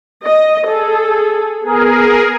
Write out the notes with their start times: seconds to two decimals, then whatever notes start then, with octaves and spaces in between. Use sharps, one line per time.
0.24 D#5
0.66 G#4 A4
1.63 B3 G#4 A#4